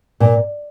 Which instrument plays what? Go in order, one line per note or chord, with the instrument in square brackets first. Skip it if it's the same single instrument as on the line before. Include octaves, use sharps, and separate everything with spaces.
[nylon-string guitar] A#2